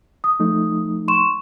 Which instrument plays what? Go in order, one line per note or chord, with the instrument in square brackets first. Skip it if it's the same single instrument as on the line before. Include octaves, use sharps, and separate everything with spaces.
[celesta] D#6
[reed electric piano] F3 A3 D#4
[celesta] C6 C#6 E7